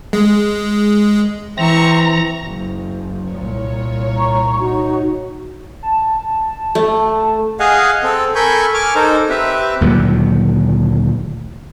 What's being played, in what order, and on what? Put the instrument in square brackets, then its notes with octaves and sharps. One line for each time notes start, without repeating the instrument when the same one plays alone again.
[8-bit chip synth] G#3
[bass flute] E3 [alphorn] C4 [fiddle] E5 C#6 [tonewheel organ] A#5
[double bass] F#1
[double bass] C2 A#2 [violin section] C#5
[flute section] A#5 C#6
D#4 F#4
[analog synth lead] A5
[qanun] A3
[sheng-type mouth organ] G#4 D#5 F5 F#5 G#5
C4 A4
A4 A#4 G#5 B5 C#6 G6
G#5 C#6 D6 F6
D#4 A4 A#4 C5
C4 G4 B4 E5
[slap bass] D2 A#2 D#3 F#3